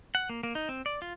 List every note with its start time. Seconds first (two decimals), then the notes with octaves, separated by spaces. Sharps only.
0.15 F#5
0.29 A#3
0.43 A#3
0.55 D#4
0.69 C4
0.86 D5
1.02 F4